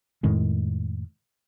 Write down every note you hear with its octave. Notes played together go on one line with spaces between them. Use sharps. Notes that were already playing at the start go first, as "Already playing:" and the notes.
F2 A2 D#3 G#3